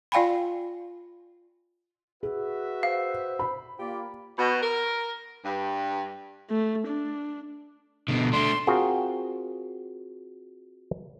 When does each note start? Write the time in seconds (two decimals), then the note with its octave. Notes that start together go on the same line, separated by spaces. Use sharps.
0.12 F4 D5 F5 G5 G#5 B5
2.23 F#4 G#4 B4 E5
2.83 C5 F5
3.39 B5
3.79 A#3 F4 G4 D5
4.38 B2
4.62 A#4
5.44 G2
6.50 A3
6.87 D4
8.08 B2 D3
8.33 A3 D4 C6
8.67 C4 F4 F#4 G#4 A#4